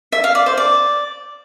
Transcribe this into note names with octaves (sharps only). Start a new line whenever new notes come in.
E5
F5
D5
C5
D5